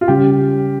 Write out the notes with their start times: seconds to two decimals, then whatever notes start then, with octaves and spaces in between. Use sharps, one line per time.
0.01 F4
0.08 C#3 G3 C#4 G4